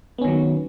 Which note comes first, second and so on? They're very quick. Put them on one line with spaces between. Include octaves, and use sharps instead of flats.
B3 C#4 D#3 F#3